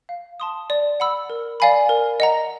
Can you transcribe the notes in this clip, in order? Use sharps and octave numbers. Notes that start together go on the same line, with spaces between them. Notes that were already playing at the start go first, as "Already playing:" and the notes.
F5
A5 C6 D#6
D5
F#5 B5 E6
A#4
D5 F5 G#5 B5
A#4
D#5 F#5 A#5